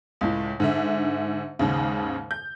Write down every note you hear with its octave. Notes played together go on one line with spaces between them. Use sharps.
C#2 A2
G#2 D3 E5
D#2 G#2 C#3
G6